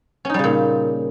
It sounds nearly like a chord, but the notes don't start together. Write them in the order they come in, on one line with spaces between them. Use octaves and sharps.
C#4 D#4 G3 C#3 A#2